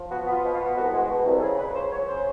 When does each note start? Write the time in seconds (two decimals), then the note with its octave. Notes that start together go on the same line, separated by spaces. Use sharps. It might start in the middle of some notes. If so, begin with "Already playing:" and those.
Already playing: F3
0.09 B3 F#4
0.26 B3
0.31 F4
0.43 B2
0.53 F4
0.60 B3
0.75 C2 F#4
0.92 G#3 F#4
1.09 B2
1.25 C2
1.37 A4
1.41 C#3 G#4
1.58 C#3 B4
1.75 C#2 C5
1.91 F#3 C#5
2.07 C#3 C5